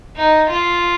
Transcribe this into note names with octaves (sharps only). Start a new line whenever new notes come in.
D#4
F4